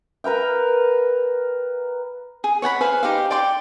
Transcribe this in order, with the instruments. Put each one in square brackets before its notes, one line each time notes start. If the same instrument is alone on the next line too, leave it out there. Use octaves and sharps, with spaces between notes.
[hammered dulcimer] A#4 B4 F5 G5
[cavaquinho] G#4
C#5 F#5 G#5 B5
G#4 B4 C5 F5
D#4 G4 C5 F5
D5 G5 C6 D6